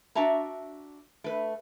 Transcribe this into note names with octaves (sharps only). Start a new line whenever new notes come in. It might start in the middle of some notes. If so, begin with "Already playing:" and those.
D4 F#4 E5 A5 A#5
A3 B4